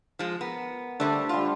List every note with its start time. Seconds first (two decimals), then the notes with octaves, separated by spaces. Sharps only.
0.19 F3 G#3
0.41 B3 A#4
1.00 D3 G3 A3 D4 C5
1.29 G3 F4 F#5